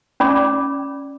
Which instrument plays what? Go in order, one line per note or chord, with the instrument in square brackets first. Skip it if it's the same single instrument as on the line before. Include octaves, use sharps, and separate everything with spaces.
[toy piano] C#4 D5 B5 D6